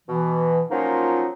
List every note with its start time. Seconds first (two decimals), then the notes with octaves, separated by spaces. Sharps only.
0.08 B2 E3
0.70 F3 F#3 A#3 C#4 D#4 F4